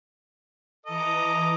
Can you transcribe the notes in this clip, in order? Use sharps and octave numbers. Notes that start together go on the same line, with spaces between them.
E3 A4 D#5 A#5 D6